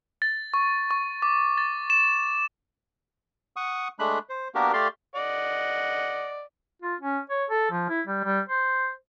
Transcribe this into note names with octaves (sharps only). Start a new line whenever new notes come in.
A6
C#6
C#6
D6
A6
E7
F#5 C#6 D#6
G#3 A3 D4 B5 F#6
C5
A#3 B3 D4 F#4 G4 A#4
A3 G4 D5 F5 C6
D5 D#5 F#5
F4
C#4
C#5
A4
F3
E4
G3
G3
C5